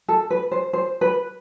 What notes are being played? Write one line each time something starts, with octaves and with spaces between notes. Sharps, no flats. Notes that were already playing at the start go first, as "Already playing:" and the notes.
A4
B4
C5
C5
B4